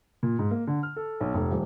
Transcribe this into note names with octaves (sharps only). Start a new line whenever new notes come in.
A#2
G#2
A#3
D3
F6
A4
B1
F1
D#1